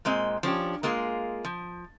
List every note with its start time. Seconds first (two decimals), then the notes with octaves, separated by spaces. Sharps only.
0.05 A#2 G#3 C4 D#5
0.43 F3 C#4 D4 G4
0.83 G#3 A#3 F4 G#4
1.45 F3